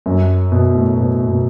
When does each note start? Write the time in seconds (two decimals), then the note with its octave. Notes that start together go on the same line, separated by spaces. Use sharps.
0.06 F#2
0.52 B2
0.75 A2
0.97 B2
1.28 B2